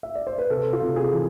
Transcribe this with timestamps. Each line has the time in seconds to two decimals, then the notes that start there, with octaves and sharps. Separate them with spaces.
0.03 E5
0.15 D5
0.27 C5
0.38 B4
0.50 C3 A4
0.73 F4
0.82 C3
0.96 G#4
1.13 E3